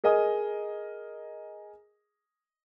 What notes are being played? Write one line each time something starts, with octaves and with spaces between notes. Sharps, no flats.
G#4 A#4 D#5 G#5 D#6